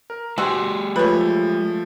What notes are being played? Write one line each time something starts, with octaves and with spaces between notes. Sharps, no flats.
A#4
G#3 F#4 G4 G#5 C6 E6
F3 A3 B4 C#5